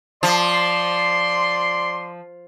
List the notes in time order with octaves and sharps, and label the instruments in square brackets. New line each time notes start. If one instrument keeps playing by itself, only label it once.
[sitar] F3 [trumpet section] D5 C6